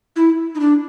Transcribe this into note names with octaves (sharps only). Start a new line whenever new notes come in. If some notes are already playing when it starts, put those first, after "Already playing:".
E4
D#4
D4